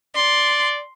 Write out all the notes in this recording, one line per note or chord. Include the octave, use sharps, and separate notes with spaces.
D5 C6